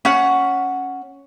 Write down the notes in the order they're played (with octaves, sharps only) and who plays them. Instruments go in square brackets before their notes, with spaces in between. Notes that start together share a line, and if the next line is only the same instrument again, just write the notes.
[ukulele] C#4 F#5